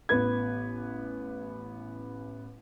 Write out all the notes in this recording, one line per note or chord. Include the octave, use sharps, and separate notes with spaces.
A1 B3 B4 G#6